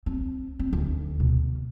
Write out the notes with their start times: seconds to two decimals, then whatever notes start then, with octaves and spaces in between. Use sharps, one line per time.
0.06 C4
0.59 C4
0.73 D2
1.20 B2